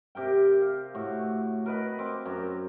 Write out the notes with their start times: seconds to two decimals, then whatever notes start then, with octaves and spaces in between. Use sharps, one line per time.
0.15 C3 G4 A#4 G5
0.62 F5
0.94 A2 F#4
1.66 A#4 B4 D#5 B5
1.99 C4 D6
2.26 F#2 A#5